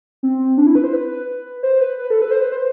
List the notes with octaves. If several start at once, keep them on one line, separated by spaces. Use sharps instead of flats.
C4
D4
E4
B4
C5
B4
C5
B4
B4
A4
B4
C5
B4
C5